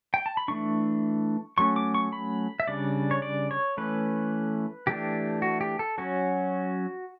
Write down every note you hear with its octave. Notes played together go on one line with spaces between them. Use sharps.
G5
A5
B5
E3 A3 D4 C#6
F#3 A3 C#4 C#6
D6
C#6
B5
E5
C#3 G3 D4 D5
C#5
D5
C#5
E3 A3 C#4 B4
E3 A3 D4 G4
F#4
G4
A4
F#3 C#4 F#4